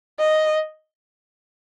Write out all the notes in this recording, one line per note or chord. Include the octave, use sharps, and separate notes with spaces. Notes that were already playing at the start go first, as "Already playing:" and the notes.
D#5